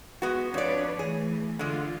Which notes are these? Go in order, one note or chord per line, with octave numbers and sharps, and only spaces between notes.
G#3 B3 F#4
F2 D4 B4 C#5 D5
E3 A3 G#4
D3 G#3 F4